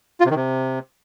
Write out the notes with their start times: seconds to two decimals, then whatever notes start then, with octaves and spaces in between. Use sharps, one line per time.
0.20 F4
0.25 C3
0.31 D#3
0.36 C3